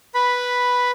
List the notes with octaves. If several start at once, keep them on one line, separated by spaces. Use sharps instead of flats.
B4 B5